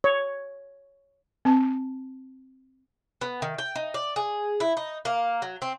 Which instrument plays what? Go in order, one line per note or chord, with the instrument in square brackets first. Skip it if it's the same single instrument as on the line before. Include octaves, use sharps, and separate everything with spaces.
[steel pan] C#5
[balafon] C4 A5
[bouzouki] B3
D#3
G5
D#4
D5
G#4
E4
D#4
A#3
F#3
C4